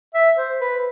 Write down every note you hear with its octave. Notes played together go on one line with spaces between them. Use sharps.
E5
C5
B4